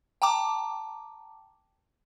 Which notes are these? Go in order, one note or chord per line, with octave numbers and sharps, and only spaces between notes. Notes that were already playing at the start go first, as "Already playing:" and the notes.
G5 A5 A#5 D6